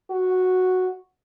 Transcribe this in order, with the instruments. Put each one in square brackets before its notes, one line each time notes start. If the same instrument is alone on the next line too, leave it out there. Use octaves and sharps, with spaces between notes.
[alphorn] F#4